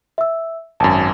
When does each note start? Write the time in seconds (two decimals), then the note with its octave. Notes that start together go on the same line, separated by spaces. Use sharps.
0.18 E5 E6
0.80 G#1 F#2 G#5 A5